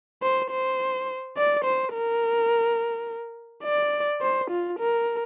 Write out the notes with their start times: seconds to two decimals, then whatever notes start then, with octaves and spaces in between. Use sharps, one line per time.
0.22 C5
0.51 C5
1.37 D5
1.65 C5
1.94 A#4
3.64 D5
4.22 C5
4.51 F4
4.79 A#4